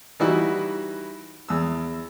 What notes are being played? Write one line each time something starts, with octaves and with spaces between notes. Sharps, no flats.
E3 G3 D#4 E4 F#4
E2 E6